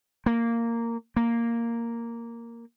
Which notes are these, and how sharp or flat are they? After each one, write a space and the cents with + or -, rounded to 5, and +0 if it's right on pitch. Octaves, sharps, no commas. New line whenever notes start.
A#3 -10
A#3 -5